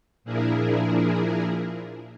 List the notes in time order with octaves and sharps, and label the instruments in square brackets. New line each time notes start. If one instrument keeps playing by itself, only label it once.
[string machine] A#2 F3 D4 E4 G#4 A#4